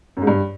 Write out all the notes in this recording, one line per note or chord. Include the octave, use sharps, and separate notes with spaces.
F#2
G#2
G2